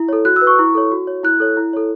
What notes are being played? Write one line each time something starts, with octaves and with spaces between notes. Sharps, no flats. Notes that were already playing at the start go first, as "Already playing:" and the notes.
Already playing: E4
A4 C#5
F#4 F#6
E6
B4
C#6
E4
A4 C#5
F#4
C#5
E4 F#6
A4 C#5
E4
A4 C#5